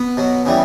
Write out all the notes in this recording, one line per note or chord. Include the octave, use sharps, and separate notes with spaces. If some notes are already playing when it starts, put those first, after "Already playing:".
Already playing: B3
B2 F#3
C#3 E3 G3